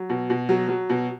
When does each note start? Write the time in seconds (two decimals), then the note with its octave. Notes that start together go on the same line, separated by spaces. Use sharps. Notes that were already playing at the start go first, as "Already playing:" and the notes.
Already playing: F#3
0.10 B2
0.30 B2
0.49 F#3
0.69 F#3
0.90 B2